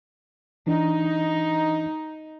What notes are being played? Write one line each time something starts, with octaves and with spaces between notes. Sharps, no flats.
E3 D4 D#4